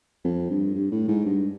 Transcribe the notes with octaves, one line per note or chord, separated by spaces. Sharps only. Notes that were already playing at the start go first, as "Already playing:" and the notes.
F2
G2
G2
A2
G#2
G2